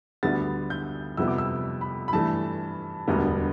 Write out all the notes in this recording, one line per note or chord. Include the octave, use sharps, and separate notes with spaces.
D2 D3 G3 B3 A6
G6
F2 C3 G3 B3 E6
D6
E6
B5
B5
G2 E3 A3 A5
E1 D2 D3 G3 B3